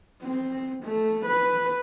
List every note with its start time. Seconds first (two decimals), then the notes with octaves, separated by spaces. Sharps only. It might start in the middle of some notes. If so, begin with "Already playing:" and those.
0.22 C4
0.83 A3
1.26 B4